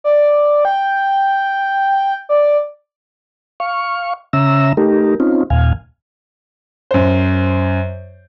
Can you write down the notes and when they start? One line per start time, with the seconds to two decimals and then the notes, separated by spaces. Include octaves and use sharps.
0.04 D5
0.65 G5
2.29 D5
3.60 F5 C#6
4.33 C#3 C#4 E5 A#5 E6
4.77 A3 D#4 G4 A#4
5.20 C4 C#4 D#4 F4
5.50 D#2 A#2 F5 G#5
6.91 F#2 C5